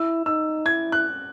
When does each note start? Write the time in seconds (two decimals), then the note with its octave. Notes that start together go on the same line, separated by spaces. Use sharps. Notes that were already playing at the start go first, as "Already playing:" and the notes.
Already playing: E4 E6
0.26 D#4 E6
0.65 E4 G#6
0.92 F#6